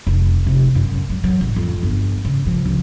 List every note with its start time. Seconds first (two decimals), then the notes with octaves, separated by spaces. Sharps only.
0.07 F1
0.46 C3
0.75 F#2
1.10 F#3
1.24 F#3
1.41 A1
1.56 F2
1.83 G1
2.25 C#3
2.46 F3
2.65 C#2